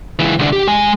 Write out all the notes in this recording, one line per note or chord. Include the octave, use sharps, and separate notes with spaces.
C#2 E3
C2 D3
G4
G#3 G#5